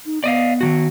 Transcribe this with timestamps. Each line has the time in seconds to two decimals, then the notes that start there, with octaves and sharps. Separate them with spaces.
0.06 D#4
0.24 B3 D5 D#5 F5
0.61 D#3 E3 F#4